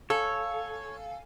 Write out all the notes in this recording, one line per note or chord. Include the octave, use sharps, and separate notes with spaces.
A4 C#5 F5 G#5